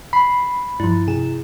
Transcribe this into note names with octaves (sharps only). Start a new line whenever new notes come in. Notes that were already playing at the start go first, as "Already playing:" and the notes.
B5 C7
G2 F3 E4
C3 G#4 E7